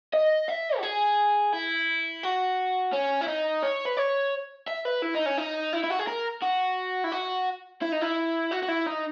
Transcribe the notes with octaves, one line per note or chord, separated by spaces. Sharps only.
D#5
E5
F#4
G#4
E4
F#4
C#4
E4
D#4
C#5
B4
C#5
E5
B4
E4
D#4
C#4
D#4
E4
E4
F#4
G#4
A#4
F#4
E4
F#4
E4
D#4
E4
F#4
F#4
E4
D#4